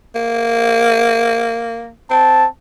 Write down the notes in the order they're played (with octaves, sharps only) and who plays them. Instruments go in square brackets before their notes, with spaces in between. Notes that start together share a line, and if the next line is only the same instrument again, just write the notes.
[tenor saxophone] A#3
[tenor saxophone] C4 [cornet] A5